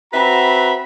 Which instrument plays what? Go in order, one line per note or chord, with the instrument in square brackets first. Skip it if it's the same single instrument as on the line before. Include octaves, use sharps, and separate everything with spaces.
[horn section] C4 F#4 B4 E5 A#5 B5